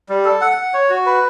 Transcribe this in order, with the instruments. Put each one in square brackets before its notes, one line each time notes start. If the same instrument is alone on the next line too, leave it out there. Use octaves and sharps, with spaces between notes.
[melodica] G3
A4
F#5
F#5
C#5
F#4
B4